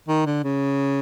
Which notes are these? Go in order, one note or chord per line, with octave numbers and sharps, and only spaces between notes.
D#3
D3
C#3